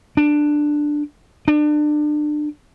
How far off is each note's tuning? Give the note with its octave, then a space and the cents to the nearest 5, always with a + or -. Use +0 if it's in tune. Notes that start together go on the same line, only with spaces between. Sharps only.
D4 +10
D4 +30